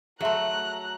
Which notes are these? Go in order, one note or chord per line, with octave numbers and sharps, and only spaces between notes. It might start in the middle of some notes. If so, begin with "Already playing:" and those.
F#3 A3 G#4 E5 A#5 C6 F#6